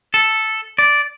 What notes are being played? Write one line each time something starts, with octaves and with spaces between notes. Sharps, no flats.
A4
D5